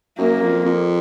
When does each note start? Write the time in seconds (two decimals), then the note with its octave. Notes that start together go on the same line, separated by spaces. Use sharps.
0.19 F#2 A#3
0.42 F2
0.65 F2